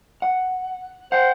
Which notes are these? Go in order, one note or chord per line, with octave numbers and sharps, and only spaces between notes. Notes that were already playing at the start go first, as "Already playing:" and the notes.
F#5
C5 F#5 G5